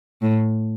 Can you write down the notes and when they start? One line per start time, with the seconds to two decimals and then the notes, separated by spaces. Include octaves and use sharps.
0.22 A2